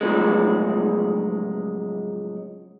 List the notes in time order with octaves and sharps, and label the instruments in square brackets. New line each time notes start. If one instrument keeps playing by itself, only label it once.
[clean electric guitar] A2 C#3 F3 F#3 G#3